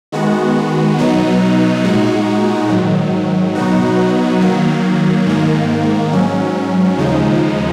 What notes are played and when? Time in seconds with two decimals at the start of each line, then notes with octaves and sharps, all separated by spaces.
0.12 D#3 G#3 B3 F#4
0.98 B2 F#3 B3 D#4
1.84 A#2 G#3 D#4 F#4
2.69 G#2 D#3 F#3
3.55 B2 F#3 B3 D#4 F#4
4.41 D#3 F#3 A#3
5.26 G#2 D#3 A#3
6.12 G#2 F#3 C#4
6.98 D#2 C#3 F3 G#3 D#4